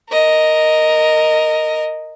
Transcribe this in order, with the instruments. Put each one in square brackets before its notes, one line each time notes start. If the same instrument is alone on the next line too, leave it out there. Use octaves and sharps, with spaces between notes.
[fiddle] A#4 D#5